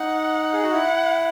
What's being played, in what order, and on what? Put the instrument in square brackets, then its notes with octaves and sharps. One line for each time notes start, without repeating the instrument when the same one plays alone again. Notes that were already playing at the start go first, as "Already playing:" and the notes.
Already playing: [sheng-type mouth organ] D#4 [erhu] F#5
[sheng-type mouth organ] G#4
F#4
[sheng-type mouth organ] E4 [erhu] F#5